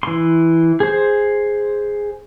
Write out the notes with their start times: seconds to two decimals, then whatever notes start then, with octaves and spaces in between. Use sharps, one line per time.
0.03 E3 C6
0.80 G#4 C5